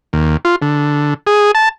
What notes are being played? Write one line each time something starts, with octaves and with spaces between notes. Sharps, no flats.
D#2
F4
D3
G#4
A5